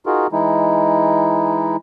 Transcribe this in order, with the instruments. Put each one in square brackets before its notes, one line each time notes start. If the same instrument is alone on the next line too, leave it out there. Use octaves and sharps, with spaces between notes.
[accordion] D#4 F4 F#4 G#4 A#4
E3 G#3 D#4 E4